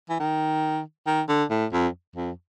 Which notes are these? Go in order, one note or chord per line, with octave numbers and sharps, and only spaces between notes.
E3
D#3
D#3
D3
A2
F2
F2